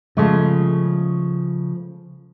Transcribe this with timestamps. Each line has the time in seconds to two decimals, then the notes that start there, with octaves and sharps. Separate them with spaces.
0.17 C#3 F3 G#3 A3